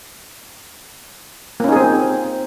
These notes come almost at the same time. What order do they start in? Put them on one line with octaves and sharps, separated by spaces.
A#3 C#4 D#4 G#4 C4